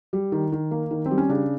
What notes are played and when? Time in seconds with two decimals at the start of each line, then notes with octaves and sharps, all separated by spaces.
0.13 G3
0.32 D#3
0.52 D#3
0.71 A#3
0.91 D#3
1.06 C4
1.11 G3
1.18 C#4
1.29 C#3 D4